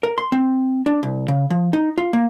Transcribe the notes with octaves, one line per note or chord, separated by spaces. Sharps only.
A#4
C6
C4
D4
C2
C#3
F3
D#4
F4
A#3